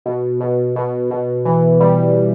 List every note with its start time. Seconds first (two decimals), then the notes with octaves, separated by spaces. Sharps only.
0.06 B2
0.40 B2
0.76 B2
1.10 B2
1.45 E3
1.80 G3